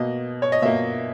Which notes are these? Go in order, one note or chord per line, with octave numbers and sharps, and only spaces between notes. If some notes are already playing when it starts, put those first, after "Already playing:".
Already playing: B2 A#3 D#5
C#5
D#5
B2 A#3 E5